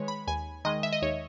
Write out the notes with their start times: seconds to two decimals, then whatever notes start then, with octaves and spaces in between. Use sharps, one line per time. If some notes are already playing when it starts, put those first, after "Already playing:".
Already playing: D#3 G#3 B4 C#5
0.08 B5
0.27 D#2 G#5
0.65 D#3 G#3 D#5
0.83 E5
0.92 D#5
1.02 D#2 C#5